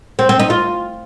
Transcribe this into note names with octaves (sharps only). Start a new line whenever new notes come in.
C4
C4
D#4
F4